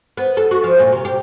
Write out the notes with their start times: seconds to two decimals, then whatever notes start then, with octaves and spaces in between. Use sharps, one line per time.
0.17 B3
0.37 A4
0.51 F#4
0.64 F3
0.79 A#2
0.92 C3
1.05 G4